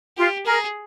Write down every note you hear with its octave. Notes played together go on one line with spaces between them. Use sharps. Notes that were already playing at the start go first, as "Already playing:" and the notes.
F4 G4
G#4 A#4